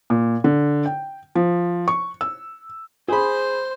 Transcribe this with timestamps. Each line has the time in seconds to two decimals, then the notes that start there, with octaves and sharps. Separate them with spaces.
0.10 A#2
0.44 D3
0.86 G5
1.35 F3
1.88 C#6
2.21 E6
3.08 G#4 C5 B5 C6